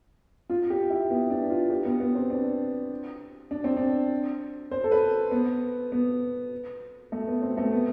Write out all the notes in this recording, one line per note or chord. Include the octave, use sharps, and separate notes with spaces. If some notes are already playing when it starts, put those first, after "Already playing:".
F4
G4
E4
B3
D4
F4
G4
B3
B3
C4
D4
D4
C4
D4
C5
A4
B4
B3
B3
A3
B3
C4
A3
B3